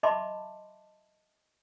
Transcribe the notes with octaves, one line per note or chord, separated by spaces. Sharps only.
D#5 E5 A5 B5 C6 D6